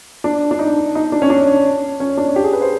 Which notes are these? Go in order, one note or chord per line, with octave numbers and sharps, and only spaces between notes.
D4
D4
D#4
D#4
D4
C#4
D4
C#4
D4
G4
G#4
B4
C5